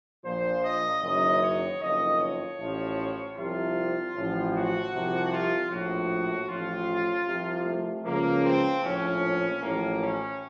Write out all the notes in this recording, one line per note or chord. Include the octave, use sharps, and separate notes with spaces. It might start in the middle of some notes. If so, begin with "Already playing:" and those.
A#1 A#2 F3 C5
D#5
F#1 F#2 D#3 D#5
C#5
F#1 F2 D#3 D#5
C#5
A1 A2 F3
C2 C3 F3 F4
A1 A2 F3
F#4
C2 C3 F3
F4
A#1 A2 F3 F#4
A1 A2 F3 F4
C2 C3 F3
A3
C#2 C#3 F3 A#3
C4
A#1 A2 F3 C#4
A1 A2 F3 A#3
C#4